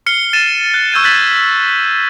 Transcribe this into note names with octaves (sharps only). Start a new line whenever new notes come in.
F6 C7 C#7 G7
A6 D#7 E7
F#6
C#6 E6 G6 G#6 C#7 D#7
F6 F#6 G#6 A6 B6 F#7